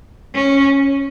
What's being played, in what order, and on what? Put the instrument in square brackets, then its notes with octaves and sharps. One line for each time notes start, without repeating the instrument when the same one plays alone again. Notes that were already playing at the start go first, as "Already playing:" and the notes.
[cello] C#4